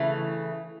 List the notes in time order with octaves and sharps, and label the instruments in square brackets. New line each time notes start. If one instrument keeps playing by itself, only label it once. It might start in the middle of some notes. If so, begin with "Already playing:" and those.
Already playing: [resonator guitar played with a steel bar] C#3 E3 A3